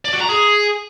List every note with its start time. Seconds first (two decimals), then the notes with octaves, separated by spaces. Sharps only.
0.05 D5
0.13 F#4
0.21 A#5
0.29 G#4